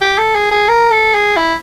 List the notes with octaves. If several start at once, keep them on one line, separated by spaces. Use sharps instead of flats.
G4
A4
G#4
G#4
A#4
A4
G#4
E4